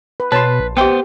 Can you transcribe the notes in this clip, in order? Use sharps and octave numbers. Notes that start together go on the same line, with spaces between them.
B4
B2 B4 C#5 A5 C6
A#1
B3 G4 C5 G5